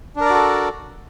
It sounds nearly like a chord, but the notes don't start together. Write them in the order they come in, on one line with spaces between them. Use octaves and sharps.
D4 A#4 D5 F#4 A4